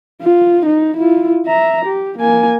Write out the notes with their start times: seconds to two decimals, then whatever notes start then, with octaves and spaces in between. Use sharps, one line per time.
0.22 F4
0.66 D#4
0.97 E4 F4
1.46 E5 A#5
1.85 G4
2.18 A#3 G#5